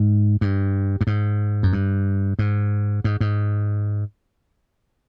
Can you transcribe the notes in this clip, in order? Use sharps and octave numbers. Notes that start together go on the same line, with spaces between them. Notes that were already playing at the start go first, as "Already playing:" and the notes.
Already playing: G#2
G2
G2
G#2
F#2
G2
G#2
G#2
G#2